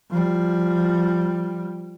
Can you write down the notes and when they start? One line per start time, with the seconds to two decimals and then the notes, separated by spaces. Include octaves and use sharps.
0.10 F3 G3